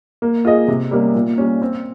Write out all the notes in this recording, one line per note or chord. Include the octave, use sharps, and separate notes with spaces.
A#3
F4 G#4 D#5
C3
G3 A#3 C#4
A#2
G3 C#4
C4